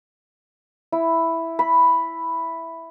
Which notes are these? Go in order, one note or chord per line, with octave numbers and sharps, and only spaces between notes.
E4
B5